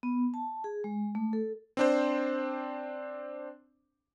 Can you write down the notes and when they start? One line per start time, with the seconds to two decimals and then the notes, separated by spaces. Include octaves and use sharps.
0.03 B3
0.34 A5
0.64 G#4
0.84 G#3
1.15 A3
1.33 A4
1.77 C4 D4 C5